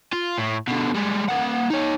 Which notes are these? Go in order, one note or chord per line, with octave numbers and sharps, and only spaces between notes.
F4
A2
B2 D3
G3 G#3
A#3 F#5
D#4 C#5